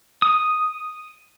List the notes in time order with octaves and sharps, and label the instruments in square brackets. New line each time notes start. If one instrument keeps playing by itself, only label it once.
[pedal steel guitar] D#6